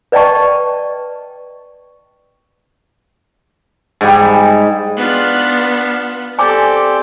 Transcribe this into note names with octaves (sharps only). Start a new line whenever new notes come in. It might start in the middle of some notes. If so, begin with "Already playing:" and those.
B4 D5 D#5 G5 A5 C#6
G#2 G3
B3 D4 F4
C4 G4 A4 D5 G5 G#5 D6